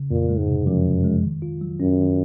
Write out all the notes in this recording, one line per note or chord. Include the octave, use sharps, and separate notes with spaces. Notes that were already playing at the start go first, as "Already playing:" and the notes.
Already playing: C#3
F2 A#2
G#3
G#2
C3
F#2 F3
F2
G#3
D#3
F4
F#3
F#2 C#4
D#3